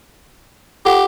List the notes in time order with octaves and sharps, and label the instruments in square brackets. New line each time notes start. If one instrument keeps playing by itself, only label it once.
[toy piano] F4 A4 F#5 [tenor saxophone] G4